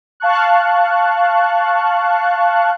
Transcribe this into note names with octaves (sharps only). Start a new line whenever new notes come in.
F5 A5 C#6 F#6